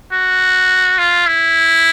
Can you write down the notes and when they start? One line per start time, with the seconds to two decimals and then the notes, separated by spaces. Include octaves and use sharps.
0.12 F#4
0.99 F4
1.27 E4